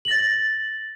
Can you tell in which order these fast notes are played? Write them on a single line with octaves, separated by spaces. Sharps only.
F#7 A#6 A6